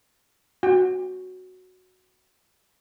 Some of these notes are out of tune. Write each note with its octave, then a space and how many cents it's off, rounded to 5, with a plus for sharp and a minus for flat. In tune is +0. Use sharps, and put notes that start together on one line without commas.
F#4 +0 G5 +30